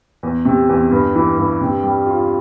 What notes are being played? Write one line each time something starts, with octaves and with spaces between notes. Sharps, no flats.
E2
C3
E2
G2
E3
G2
C3
G3
F4